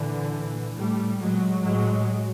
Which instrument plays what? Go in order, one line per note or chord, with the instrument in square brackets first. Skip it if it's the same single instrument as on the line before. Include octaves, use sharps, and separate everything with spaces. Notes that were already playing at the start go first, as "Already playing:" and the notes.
Already playing: [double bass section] A#2 D3 E3
A#2
A2 G3 A3
A#2 F#3 G#3
A2 F#3 G#3